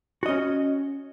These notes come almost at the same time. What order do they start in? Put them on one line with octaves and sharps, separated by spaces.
F#4 D#5 C#4